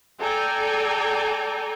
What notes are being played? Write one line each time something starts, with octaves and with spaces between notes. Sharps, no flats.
A4 D5 G5 G#5 A#5